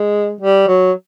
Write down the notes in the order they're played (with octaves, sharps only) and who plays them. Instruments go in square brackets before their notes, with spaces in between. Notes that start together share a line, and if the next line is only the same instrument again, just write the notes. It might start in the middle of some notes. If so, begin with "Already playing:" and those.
Already playing: [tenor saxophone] G#3
G3
F#3